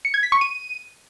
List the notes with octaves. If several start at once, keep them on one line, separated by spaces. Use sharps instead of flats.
C#7
G#6
B6
C#6
D#7